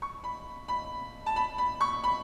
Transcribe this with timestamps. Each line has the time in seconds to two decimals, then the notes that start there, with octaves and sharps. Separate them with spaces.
0.02 C#6
0.24 B5
0.68 B5
1.26 A5
1.36 B5
1.58 B5
1.81 C#6
2.04 B5